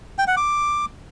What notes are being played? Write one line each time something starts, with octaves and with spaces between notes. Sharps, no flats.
G5
F#5
D6